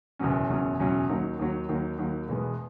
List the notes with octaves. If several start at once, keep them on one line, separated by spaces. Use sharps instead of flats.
F#1 E2 B2 F#3 C#4
F#1 E2 B2 F#3 C#4
F#1 E2 B2 F#3 C#4
D#2 D#3 F#3
D#2 D#3 F#3
D#2 D#3 F#3
D#2 D#3 F#3
E1 E2 B2 G#3 B3